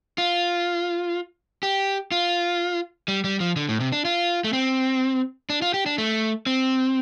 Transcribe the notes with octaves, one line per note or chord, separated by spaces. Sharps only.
F4
G4
F4
G3
G3
F3
D3
A2
C3
D4
F4
A3
C4
D4
F4
G4
D4
A3
C4